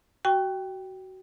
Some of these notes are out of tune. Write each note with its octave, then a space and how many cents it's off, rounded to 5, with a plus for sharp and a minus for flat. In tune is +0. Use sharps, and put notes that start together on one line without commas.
F#4 +25 G5 +0 C#6 +5